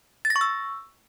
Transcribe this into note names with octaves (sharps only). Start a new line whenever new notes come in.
A6
A#6
C#6
E6